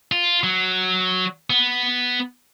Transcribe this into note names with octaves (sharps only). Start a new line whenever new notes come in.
F4
F#3
B3